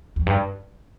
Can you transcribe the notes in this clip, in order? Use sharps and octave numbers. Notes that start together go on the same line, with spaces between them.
F2
G2